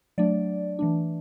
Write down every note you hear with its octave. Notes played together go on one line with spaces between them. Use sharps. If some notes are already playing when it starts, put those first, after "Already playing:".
F#3 A3 D4 D5
E3 A3 D4